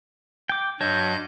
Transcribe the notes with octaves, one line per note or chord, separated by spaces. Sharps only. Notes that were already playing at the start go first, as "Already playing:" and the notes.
G5 D6
G2 F#3 C#5 D#5 A5 G6